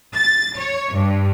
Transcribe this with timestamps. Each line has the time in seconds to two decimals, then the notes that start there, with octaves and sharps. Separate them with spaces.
0.15 A6
0.58 C#5
0.93 G2